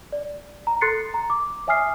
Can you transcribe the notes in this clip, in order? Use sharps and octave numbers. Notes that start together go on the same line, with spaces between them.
D5
A#5
A4 C6 F#6 A6 C7 C#7
A#5
D6
C#5 E5 G#5 D#6 F6 C7